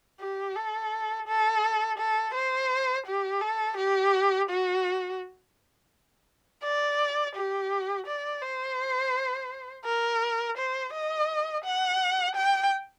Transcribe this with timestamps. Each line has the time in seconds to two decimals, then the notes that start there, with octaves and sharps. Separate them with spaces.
0.20 G4
0.55 A4
1.27 A4
1.98 A4
2.34 C5
3.06 G4
3.41 A4
3.77 G4
4.49 F#4
6.63 D5
7.35 G4
8.06 D5
8.42 C5
9.85 A#4
10.57 C5
10.93 D#5
11.64 F#5
12.35 G5